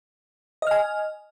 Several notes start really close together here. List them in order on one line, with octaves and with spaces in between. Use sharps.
D#5 F6 G#5